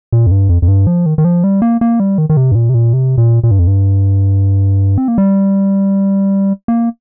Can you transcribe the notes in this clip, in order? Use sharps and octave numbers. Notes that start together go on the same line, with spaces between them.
A#2
F2
G2
F2
F2
G2
F3
D#3
D#3
F3
G3
A#3
A#3
G3
D#3
D#3
C3
G2
A#2
C3
A#2
C3
A#2
A#2
G2
F2
G2
C4
A#3
G3
A#3